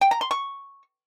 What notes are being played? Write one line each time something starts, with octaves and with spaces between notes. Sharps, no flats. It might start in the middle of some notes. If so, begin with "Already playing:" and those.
G5
A#5
C6
C#6